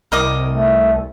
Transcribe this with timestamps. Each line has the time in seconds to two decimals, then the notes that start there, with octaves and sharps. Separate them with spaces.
0.12 C2 A#4 D#5 D6
0.49 A3